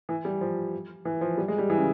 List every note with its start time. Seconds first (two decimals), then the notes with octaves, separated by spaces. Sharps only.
0.09 E3
0.25 G3
0.41 F3
1.05 E3
1.21 F3
1.37 G3
1.48 G#3
1.58 G3
1.70 E3
1.78 C#3